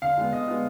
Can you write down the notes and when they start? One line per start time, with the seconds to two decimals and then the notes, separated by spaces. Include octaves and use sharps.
0.02 D3 F5
0.18 G#3 B3
0.33 D3 D#5
0.48 G#3 B3